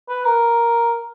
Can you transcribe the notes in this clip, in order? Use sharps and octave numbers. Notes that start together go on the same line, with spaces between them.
B4
A#4